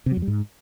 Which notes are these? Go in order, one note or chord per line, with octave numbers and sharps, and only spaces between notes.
C3
F#3
F2
G3
G#2